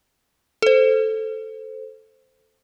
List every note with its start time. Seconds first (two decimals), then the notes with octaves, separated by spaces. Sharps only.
0.62 A4 C5